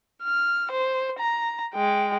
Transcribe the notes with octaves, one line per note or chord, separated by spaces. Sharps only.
F6
C5
A#5
G#3 G5